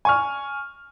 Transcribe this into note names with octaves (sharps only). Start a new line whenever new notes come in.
G#5 C#6 F6